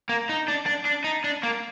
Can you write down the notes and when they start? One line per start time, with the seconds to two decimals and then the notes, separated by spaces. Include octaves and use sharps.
0.09 A#3
0.29 D#4
0.48 D4
0.66 D4
0.85 D4
1.04 D#4
1.24 D4
1.43 A#3